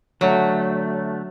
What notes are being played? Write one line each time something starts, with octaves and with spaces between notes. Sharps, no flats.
D3 F#3 A3